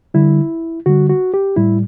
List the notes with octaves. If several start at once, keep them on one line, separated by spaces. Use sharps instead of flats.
D3 G3 E4
D3 G3 F#4
F#4
G4
A2 G3 E4